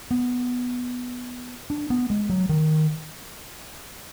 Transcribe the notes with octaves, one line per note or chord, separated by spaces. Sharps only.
B3
D4
B3
G#3
F#3
D#3